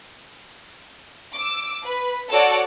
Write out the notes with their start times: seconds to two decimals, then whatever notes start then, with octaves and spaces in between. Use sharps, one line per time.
1.36 D6 E6
1.84 B4 B5
2.30 F#4 A4 C#5 D5 F#5 D7